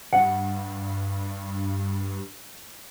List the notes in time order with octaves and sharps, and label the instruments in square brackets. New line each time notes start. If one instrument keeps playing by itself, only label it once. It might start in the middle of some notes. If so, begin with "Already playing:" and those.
[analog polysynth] G2 [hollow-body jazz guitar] F#5